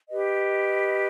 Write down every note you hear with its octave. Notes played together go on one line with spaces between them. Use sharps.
G4 B4 D#5